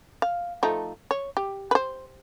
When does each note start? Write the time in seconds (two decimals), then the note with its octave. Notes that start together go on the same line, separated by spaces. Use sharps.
0.22 F5
0.63 F3 A3 D#4
1.11 C#5
1.37 G4
1.71 B4 C5